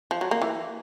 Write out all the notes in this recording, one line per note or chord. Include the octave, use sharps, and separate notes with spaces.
F3
F#3
A#3
E3